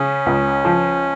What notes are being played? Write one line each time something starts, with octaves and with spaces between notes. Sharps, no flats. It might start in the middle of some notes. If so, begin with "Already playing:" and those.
Already playing: C#3 C#4
C#2
F3